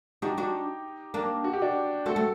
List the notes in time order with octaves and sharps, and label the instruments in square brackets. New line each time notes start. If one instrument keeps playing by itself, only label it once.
[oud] D4 F#4 [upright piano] D#4 G4
[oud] D4 F#4
A#3 D4
[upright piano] F#4
G4
D4 F#4
[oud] A3 C4 [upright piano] F#4 A4
[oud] A3 C4